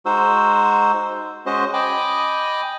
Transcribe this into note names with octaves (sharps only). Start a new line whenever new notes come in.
G#3 D#4 F#4 C5 E6
G#3 C#4 F#4 C5 D#5
D#5 G5 G#5 B5 D6